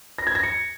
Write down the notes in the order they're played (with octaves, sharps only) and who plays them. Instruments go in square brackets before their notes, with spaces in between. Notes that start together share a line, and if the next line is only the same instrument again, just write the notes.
[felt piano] A#6
G#6
A#6
C#7